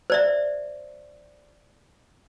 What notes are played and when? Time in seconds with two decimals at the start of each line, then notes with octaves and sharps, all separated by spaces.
0.10 C5 D5 E5